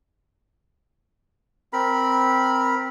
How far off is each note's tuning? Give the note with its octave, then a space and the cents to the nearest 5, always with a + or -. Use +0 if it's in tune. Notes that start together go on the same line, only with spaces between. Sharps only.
C4 +0 A#4 +0 B5 -10